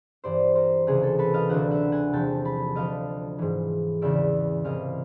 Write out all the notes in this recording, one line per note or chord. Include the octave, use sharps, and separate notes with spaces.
G2 E3 C5 D5
A#4 C5
C#2 C3 E3 G#4
A4
A4 B4
D#5 F5
D2 D3 F#3 E5 F#5
E5 F#5
F#5 G#5
E2 C3 F3 G5 A5
A5 B5
D2 D3 F3 D#5 F5
G#2 E3
E2 C#3 E3 D5 E5
C2 C3 E3 D#5 F5